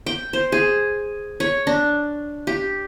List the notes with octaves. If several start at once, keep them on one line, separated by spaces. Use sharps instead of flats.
G5
C5
G#4
C#5
D4
G4